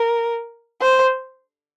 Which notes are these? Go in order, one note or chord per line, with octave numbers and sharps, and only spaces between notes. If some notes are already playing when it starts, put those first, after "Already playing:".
Already playing: A#4
C5